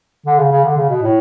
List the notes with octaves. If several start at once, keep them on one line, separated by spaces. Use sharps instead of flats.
D3
C#3
C#3
D3
C#3
B2
A2